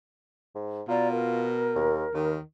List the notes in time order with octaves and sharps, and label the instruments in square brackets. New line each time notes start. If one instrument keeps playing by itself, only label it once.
[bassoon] G#2
[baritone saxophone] B2 [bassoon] F4 [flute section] D5 A#5
[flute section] A#4
[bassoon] D#2
[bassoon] D#2 [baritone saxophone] D#3